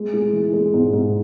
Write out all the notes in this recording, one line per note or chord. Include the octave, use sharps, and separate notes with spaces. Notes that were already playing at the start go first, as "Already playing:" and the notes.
Already playing: G#3
G#3
E3
G#3
G#2
G#2